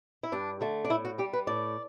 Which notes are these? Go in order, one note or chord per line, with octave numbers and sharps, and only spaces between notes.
E4
G2 D4
D3 A3
D4
A2 E4
F#4
G3 G4
B4
A2 D5